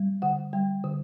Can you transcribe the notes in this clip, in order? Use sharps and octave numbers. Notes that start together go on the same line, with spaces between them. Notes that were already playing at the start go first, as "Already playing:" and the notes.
Already playing: G3
D3 F#5
G3 G5
D3